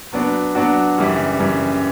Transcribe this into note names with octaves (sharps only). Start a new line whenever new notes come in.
F#3 B3 D4 F#4
F#3 B3 D4 F#4
F#2 C#3 E3 G3
F#2 C#3 E3 G3